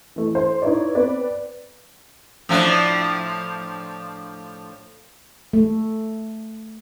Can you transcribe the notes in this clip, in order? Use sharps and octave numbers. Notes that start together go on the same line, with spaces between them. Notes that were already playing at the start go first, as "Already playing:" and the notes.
E3 A3
C5
D#4 E4 B4 C#5 D5
B3 C4 B4 D5
A2 F3 D4
A3